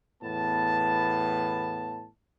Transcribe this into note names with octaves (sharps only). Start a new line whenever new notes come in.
E2 A2 B3 A5